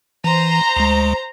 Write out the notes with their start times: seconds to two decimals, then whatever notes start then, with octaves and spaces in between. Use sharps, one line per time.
0.24 E3 C5 A#5
0.76 D2 G#3